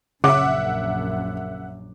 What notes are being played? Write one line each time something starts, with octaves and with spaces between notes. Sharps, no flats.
A#1 F#2 C#3 E5 F#5 D6